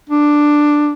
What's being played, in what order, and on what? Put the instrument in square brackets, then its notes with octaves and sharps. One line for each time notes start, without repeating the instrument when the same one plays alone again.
[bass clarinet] D4